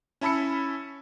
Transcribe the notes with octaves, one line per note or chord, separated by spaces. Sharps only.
C#4 E4 A5 B5 E6 C#7